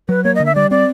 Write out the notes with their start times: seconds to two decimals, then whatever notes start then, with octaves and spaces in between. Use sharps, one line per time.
0.09 F#3 B4
0.24 A#3 C#5
0.35 D#5
0.40 D3
0.46 E5
0.55 G3 D5
0.71 C4 D5